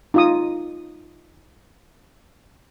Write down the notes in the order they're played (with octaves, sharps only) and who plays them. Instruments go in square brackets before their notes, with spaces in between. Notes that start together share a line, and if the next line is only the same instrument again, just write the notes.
[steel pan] D#4 F4 D#6